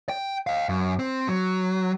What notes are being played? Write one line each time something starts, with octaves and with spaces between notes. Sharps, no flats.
G5
D#5 F5
F#2
C4
F#3